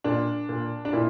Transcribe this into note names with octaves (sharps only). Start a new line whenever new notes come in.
A#2 D4
A#2
D4
A#2 E4